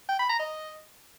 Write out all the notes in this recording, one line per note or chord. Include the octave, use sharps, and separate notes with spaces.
G5
B5
A#5
D#5